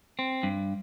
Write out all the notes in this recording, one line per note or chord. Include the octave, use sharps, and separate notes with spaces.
C4
G2